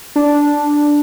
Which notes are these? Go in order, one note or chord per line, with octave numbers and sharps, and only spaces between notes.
D4